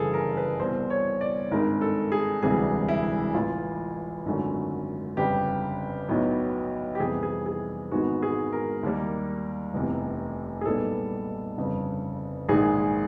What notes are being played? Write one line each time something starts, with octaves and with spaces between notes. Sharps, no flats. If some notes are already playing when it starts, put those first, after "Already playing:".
Already playing: G1 F#2 C#3 E3 G#4 A4
A#4
B4
C2 B2 G3 C5
C#5
D5
G#1 G2 D#3 G#3 A#4
A4
G#4
E1 D2 C3 E3 G3 G#4
E4
A1 A2 E3 F4
G#1 F#2 D3 F#3 A3
G1 F2 C#3 G4
B1 A2 F#3 B3
G4
F2 C3 E3 G3 B3 G#4
G#4
G#4
G#1 G#2 D#3 G#3 B3 F#4
G#4
A#4
D#2 D#3 G3 A#3
F1 E2 C3
G#4
B1 A#2 G3 B3 A4
G1 F2 C#3
A#1 G#2 D#3 G#3 G#4